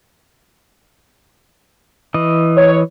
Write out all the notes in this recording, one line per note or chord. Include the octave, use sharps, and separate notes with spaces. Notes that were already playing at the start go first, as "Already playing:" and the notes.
E3 D#5
C#5